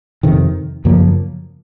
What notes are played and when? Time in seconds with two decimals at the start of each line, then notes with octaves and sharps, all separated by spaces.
0.23 F2 C3 D#3
0.85 F#2 C#3 F3 A#3